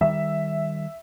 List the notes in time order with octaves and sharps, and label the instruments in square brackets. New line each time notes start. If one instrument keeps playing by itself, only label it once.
[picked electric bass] D#3 G3 [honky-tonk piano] E5